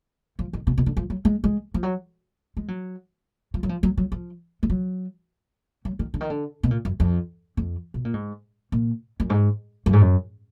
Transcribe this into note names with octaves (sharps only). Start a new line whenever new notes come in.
F3
D#3
B2
B2
D3
F3
F#3
G#3
G#3
F3
F#3
G#3
F#3
F3
F#3
F3
F#3
F#3
F3
G#3
F#3
F#3
D#3
D3
D#3
D3
B2
A#2
F#2
F2
F2
B2
A#2
G#2
A#2
F#2
G#2
F#2
G#2
F#2